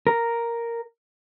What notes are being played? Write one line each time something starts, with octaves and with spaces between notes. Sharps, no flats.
A#4